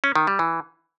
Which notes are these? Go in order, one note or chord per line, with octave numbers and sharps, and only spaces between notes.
C#4
D#3
G3
E3